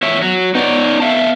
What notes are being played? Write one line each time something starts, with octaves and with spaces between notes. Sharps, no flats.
E2 C#5 E5
F#3
B3 D#4 C#5 D5
E5 F5 A5